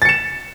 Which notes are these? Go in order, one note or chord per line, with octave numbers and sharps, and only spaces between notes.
A6 C#7 E7